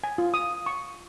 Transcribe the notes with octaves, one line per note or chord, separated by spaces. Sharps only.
G#5
F4
D#6
C#6